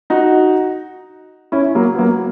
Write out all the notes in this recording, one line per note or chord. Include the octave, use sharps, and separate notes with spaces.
D#4 F#4
C#4 E4
F#3 A#3
B3
F#3 A#3